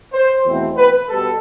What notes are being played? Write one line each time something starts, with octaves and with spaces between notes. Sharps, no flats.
C5
E2 B2 A3 C4 E4
B4
B2 G3 A4